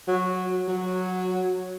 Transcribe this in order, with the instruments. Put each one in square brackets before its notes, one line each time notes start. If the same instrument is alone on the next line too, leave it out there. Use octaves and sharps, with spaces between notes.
[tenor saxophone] F#3
F#3